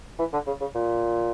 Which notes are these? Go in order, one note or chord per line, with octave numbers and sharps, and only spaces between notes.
E3
D3
C#3
C#3
A#2